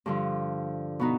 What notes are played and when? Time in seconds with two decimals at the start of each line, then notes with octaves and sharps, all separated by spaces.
0.06 G2 D3 F3
0.99 B2 B3 D#4